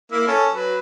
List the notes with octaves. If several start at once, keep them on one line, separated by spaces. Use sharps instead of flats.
A#3 E4 E5
C#4 A4
F#3 B4